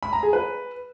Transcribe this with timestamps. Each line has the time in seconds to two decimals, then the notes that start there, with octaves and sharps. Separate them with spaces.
0.03 B5
0.13 A#5
0.23 G#4
0.33 B4